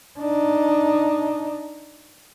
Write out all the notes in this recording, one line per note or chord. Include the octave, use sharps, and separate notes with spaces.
D4 D#4